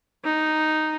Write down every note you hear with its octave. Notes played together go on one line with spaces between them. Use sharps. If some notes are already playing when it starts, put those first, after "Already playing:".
D#4